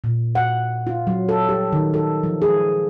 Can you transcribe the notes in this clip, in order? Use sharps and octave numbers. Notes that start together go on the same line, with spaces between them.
A#2
F#5
F4
F#3
A4
G4
D#3
A4
F3
G#4